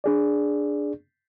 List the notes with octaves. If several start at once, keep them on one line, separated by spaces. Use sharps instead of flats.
D4 G#4 D5